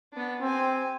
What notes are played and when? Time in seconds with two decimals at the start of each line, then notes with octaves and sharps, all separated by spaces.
0.13 B3 D4
0.42 C4 G4 G#5